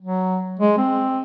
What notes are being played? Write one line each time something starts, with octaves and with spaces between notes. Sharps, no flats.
F#3
G#3
C4